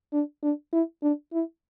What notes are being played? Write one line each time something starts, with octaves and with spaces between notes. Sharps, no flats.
D4
D4
E4
D4
E4